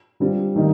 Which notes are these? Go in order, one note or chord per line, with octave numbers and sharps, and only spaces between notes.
D3 G3 C4 F4
D#3 G3 A#3 D#4